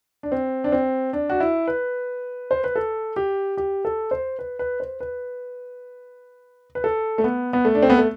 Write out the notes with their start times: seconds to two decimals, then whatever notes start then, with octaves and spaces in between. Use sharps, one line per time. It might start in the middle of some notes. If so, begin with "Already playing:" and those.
0.23 D4
0.32 C4
0.64 D4
0.72 C4
1.13 D4
1.30 F#4
1.40 E4
1.67 B4
2.51 C5
2.64 B4
2.76 A4
3.16 G4
3.57 G4
3.85 A4
4.11 C5
4.39 B4
4.59 B4
4.80 C5
5.00 B4
6.75 B4
6.84 A4
7.18 A3
7.24 B3
7.53 B3
7.65 A3
7.75 D4
7.82 C4
7.90 B3
7.98 A3